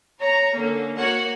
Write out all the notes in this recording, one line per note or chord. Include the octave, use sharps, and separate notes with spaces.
C#5 A#5
D3 A#3 C#4
A#3 F#4 C#5 F#5